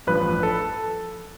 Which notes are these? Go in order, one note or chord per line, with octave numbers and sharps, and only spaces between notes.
A1 G2 F3 B4
A4